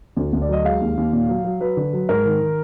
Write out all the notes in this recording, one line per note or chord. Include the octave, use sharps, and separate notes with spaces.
D2
D2
D5
F#3 D#5
G#3 F5
D#2
D#2
A#2
F#3
F#3
F#3 B4
D3
F#3
G#2 A#4
D#3
D#3